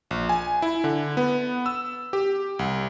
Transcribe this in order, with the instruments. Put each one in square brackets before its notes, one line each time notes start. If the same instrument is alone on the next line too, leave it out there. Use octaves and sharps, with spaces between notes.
[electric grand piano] A#1
G#5
E4
D3
B3
E6
G4
C2